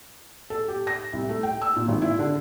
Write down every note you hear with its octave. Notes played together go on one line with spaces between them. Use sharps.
A4
G4
A#6
C2
A3
G5
E6
A#2
G#1
E4
D3